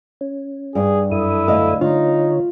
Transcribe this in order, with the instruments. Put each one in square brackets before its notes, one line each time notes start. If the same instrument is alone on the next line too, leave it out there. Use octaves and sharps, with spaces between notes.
[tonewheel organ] C#4
[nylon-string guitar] G2 [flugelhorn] G#4
[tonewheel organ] F#2 A4 D#6 [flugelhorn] E4
[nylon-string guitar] D2 D#5 F5
[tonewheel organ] D3 C#5 [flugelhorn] D#4 [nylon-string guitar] F4